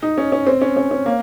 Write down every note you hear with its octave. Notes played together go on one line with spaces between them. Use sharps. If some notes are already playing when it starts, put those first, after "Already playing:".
D#4
C#4
C#4
C4
C#4
C#4
C#4
A#3